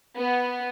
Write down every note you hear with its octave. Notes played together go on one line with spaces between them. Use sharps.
B3